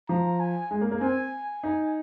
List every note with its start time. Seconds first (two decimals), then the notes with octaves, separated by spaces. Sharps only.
0.09 F3 A#5
0.40 G#5
0.71 G#3
0.81 A#3
0.91 A#3
1.01 C4 G#5
1.63 D#4